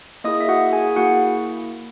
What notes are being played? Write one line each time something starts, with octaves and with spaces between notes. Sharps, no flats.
A#3 E4 G#4 D#5 D#6
E5
F#4 F#5
G#4 G#5
A#3 E4 F#4 G#4 F#5